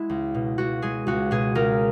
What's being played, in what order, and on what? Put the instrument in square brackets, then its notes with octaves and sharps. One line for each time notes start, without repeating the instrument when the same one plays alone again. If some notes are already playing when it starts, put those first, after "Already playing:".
Already playing: [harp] G#3 E4 F#4
C#2
B2
C#2 F#4
G#3 G#4
C#2 F#4
B2 G#4
C#2 A#4